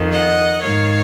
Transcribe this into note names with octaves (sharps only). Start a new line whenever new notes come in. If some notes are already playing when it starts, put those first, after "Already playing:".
Already playing: F2 D#3
D#5 F#5
G#2 D#3 C#5 F5